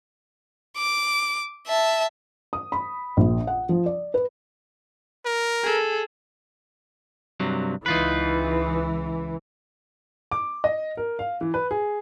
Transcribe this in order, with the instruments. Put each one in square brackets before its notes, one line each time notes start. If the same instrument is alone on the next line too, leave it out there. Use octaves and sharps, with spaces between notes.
[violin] D6
E5 A5
[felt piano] D#6
B5
A#1
F#5
F3
D5
B4
[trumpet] A#4
[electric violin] G#4 A4
[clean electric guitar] G2 C3 F#3
[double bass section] C#2 E3 [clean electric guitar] D#4 F4 B4
[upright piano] D6
D#5
A#4
F5
E3
B4
G#4